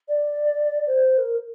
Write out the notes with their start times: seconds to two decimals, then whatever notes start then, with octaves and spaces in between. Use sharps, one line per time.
0.08 D5
0.86 C5
1.17 A#4